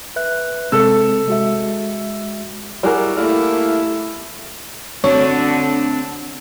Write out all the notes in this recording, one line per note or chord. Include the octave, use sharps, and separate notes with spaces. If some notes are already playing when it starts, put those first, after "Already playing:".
B4 E5 F#6
C3 G#3 C4 A4 E6
G#3 F#4 E5
G3 E4 F#4 G#4 A#4 D5
A3 A#3 E4 D5 F6
D3 A3 C4 D4 F#4 C#5